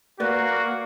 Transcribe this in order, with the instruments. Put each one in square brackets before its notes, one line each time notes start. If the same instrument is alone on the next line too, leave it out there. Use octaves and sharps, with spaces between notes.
[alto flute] A#3 [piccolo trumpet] F#4 [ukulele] B4 D5